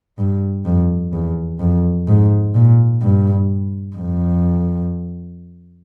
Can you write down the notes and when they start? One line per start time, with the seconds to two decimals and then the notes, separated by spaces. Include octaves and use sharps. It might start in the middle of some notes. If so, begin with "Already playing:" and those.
0.18 G2
0.66 F2
1.13 E2
1.60 F2
2.08 G#2
2.55 A#2
3.02 G2
3.97 F2